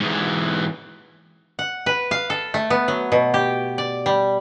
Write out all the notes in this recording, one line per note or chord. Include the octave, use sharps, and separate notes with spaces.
G#2 E3
F#5
B4
F5
A4
A3
B3
F#3
B2
G4
D5
G3